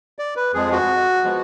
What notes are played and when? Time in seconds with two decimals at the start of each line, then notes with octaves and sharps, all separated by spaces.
0.19 D5
0.36 B4
0.54 F2 F3 G#3 G#4
0.72 F#4
1.24 F3 G#3 B3